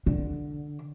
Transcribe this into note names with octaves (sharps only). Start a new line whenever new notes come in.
D3